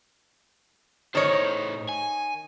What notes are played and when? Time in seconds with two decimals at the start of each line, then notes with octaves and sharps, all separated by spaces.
1.15 A2 D#3 C5 C#5
1.89 G#5